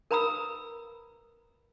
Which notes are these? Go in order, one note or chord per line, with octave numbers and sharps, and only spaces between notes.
A#4 B4 A#5 B5 D#6 E6